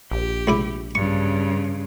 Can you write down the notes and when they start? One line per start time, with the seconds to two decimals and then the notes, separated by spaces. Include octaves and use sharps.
0.11 A#1 G4
0.47 C#2 E4 D6
0.95 G2 C#3 C#6